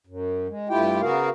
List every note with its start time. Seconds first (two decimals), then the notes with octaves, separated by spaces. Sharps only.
0.07 F#2
0.48 G#3
0.69 G2 A3 E4 F4 G4 G5
1.01 C#3 B3 F#4 G#4 A#4 F5